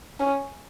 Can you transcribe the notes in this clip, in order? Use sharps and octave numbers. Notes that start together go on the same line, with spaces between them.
C#4